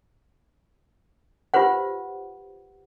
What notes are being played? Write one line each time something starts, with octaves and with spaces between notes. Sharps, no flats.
F4 G4 B4 C5 F#5